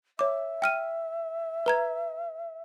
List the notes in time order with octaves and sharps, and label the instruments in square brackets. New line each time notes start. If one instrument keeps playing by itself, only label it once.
[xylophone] C#5 D6 [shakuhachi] E5
[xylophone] G5 F6 D#7
B4 A#5 G#6